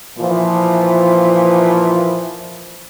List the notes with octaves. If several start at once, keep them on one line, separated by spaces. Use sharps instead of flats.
A#2 E3 F3